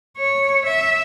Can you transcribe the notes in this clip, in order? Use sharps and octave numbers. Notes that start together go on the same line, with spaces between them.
C#5
E5